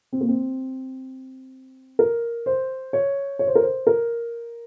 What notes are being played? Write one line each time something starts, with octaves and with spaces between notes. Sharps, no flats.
C4
A#3
C4
A#4
C5
C#5
C#5
C5
A#4
C5
A#4